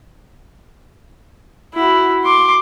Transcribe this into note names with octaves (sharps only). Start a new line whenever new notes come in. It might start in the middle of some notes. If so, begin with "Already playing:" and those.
E4 F#4
C6 D6